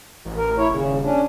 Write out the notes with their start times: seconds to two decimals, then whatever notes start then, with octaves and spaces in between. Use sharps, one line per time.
0.25 A1
0.36 A#4
0.57 E4 C#5
0.71 D#1 C#3
1.03 C#4 D4